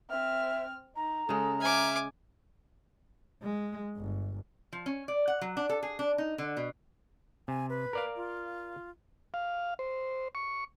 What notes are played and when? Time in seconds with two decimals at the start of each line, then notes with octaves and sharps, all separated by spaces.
0.10 C4 E5 F6
0.96 D#4 A#5
1.29 C#3 G#3 A4
1.61 E5 G#5 D6 F6
3.43 G#3
3.97 G1
4.72 F3
4.86 C#4
5.08 D5
5.28 F#5
5.41 F#3
5.57 D4
5.69 A4
5.83 G#4
5.99 D4
6.18 D#4
6.38 D3
6.57 B2
7.48 C3 G#5
7.69 B4
7.93 A#4 D5 F5
8.16 F4
9.34 F5
9.79 C5
10.35 C#6